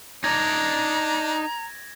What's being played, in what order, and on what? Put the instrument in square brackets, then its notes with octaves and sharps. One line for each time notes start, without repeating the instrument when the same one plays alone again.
[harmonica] D4 [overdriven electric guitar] D#4 D5 [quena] A#5 [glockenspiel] G#6 A#6